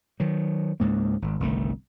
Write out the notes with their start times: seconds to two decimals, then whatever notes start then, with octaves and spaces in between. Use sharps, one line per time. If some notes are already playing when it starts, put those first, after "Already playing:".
0.20 D#3 F#3
0.80 C#2 G#2 A#3
1.22 G#1
1.40 G1 C2 D#3 A3